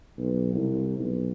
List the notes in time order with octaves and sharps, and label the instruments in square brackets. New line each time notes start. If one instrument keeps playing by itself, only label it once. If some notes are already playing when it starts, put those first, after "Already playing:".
[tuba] B1
C2
B1